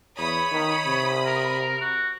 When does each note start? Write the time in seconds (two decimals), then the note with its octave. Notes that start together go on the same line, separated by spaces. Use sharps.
0.18 E2 C#5 B5 D#6
0.52 D#3
0.86 C3
1.26 A#4
1.81 F#4